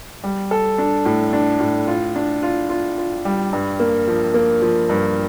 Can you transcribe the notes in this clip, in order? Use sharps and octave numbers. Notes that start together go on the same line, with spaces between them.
G3
A4
D4
A2
D4
A2
F4
D4
F4
F4
F4
G3
G2
A#3
F3
A#3
F3
G2